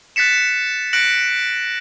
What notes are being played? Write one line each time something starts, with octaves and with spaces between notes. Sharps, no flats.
F#6 A6 B6 C#7 E7
F#6 A#6 C#7 D7 F#7